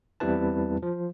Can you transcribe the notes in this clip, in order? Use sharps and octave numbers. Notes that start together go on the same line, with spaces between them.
E2 G3 C4 E4 B4 A5
F3